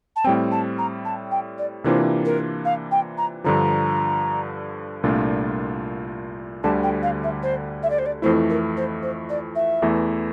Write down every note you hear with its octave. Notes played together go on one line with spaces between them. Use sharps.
A5
A2 G3 C4 G5
A5
A#5
A5
G5
D5
C3 E3 A#3 D4 F4 C5
A#4
F5
G5
A#5
G2 D3 F3 A#5
C2 A#2 A3 D4 F4
D2 D3 G3 A5
G5
F5
E5
C5
E5
D5
C5
D5
F2 E3 A3 E4 C5
A#4
C5
C5
D5
E5
E2 E3 A3 E4